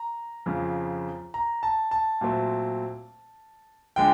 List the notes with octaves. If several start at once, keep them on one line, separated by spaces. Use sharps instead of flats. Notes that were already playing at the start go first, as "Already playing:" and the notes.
Already playing: A#5
F2 C#3 F3
A#5
A5
A5
A#2 F#3 A3 C4
D3 F3 G#3 G5